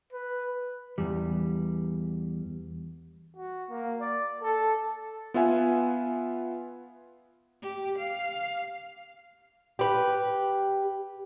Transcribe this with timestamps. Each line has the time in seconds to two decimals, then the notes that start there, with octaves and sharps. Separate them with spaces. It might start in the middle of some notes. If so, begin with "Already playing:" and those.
0.13 B4
0.98 E2 G3
3.37 F#4
3.70 A#3
4.01 D5
4.42 A4
5.34 B3 F4 E5 F#5 G#5
7.63 G4
7.98 F5
9.79 G4 B4